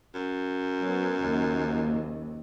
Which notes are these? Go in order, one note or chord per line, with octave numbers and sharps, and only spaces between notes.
F#2
F#3 B3
F#1 D#2